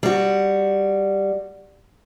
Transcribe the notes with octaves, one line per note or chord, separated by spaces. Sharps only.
G3 F#4